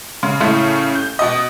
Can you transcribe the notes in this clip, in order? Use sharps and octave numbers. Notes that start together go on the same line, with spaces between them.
C#3
A2 C#3 A3
G6
B2 D#5